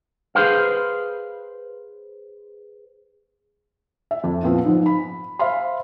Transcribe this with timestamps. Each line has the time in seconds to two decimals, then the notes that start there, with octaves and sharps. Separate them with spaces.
0.35 G#4 A4 B4 C5 F5
4.11 E5
4.24 F2
4.43 A#2 F3 B3 C4 F4
4.65 G#2 F3
4.86 B5
5.39 C5 E5 F5 B5 C6